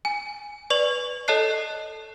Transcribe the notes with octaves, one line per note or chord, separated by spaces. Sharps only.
G#5
B4 D5 C#6 F7
A4 C#5 D#5 A5 F#6 C7